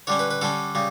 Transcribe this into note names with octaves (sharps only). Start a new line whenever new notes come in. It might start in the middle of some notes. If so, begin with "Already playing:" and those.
D3 G3 C#4 C#5
B4
B4
D3 G3 C#4 A4
C#3 G3